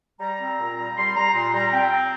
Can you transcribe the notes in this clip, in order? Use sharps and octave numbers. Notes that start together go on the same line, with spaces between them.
G3 A#5
C4
A#2
G3
G3 C6
G3 A#5
A#2 C6
G3 A#5
C4 G5
C4